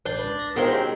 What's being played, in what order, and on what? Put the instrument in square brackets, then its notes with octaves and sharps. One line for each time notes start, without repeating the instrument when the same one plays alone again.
[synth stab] A1 G6 C7 [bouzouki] D4
[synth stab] C#2 B4
A#6
[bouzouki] D#3 G#3 C4 [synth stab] B3 F4 F#4
[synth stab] G3 C#4 D#4